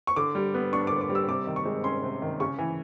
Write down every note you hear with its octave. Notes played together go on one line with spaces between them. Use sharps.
C#6
D3 D6
G3
B3
D4 C#6
D3 D6
D6
G3
E6
C3 D6
D#3
C#6
G#3
C#4 C6
C3
D#3
C#3 C#6
E3